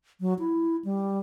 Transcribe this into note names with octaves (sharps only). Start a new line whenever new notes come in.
F#3
E4
G3